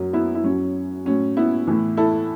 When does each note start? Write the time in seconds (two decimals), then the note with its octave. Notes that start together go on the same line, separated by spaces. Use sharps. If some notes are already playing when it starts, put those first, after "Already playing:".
Already playing: F#2 F#3
0.13 B3 E4
0.35 E4
0.44 F#2 F#3 C#4
1.06 A2 F#3 C#4
1.37 B3 E4
1.67 A2 E3
1.97 E4 A4